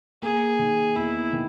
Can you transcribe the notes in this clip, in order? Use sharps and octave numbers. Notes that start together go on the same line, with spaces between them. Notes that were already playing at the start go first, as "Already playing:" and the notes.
A#3 G#4
D#3
E2 E4
D#3